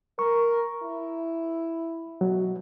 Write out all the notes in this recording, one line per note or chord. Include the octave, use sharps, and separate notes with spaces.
A#4 C#6
E4
B2 F#3